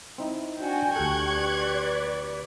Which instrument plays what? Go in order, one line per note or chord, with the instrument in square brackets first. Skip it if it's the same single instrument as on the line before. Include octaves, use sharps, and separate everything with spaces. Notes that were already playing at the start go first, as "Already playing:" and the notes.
[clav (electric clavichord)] C4 D#4 E4
[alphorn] D4 [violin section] F#4 G#5 [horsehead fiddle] G5
[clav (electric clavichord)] D2 A4 [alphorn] G4 [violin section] C#6 F#6 G#6
[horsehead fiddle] B4 D5